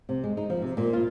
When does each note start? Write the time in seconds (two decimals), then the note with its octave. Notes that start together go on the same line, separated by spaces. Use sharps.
0.09 C3
0.24 G#3
0.37 D#4
0.50 F3
0.62 C3
0.77 A#2
0.93 F4